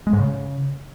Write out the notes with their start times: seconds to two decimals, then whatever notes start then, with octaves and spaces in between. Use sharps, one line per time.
0.07 G#3
0.13 G#2
0.19 C#3